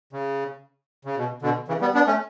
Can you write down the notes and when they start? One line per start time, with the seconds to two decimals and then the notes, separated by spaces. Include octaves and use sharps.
0.13 C#3
1.05 C#3
1.17 B2
1.42 B2 D3
1.68 C#3 E3
1.81 G3 B3
1.94 B3 D4
2.07 A3 C#4